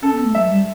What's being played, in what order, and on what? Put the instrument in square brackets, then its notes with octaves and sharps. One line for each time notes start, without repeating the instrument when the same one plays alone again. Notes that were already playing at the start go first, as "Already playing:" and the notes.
[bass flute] C#4 [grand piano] A4
[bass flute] B3
A3
[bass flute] F#3 [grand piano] E5
[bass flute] G3